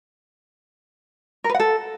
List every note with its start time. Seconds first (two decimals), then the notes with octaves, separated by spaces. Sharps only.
1.44 A#4
1.49 B4
1.55 F#5
1.60 A4